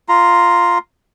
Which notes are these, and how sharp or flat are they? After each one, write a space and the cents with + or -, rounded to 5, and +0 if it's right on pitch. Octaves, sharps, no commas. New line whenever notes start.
F4 +0 A#5 +0